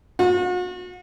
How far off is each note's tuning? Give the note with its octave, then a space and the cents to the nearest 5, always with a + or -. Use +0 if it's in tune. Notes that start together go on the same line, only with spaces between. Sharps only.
F#4 -40